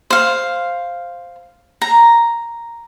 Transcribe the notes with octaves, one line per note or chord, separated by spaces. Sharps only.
C5 F5
A#5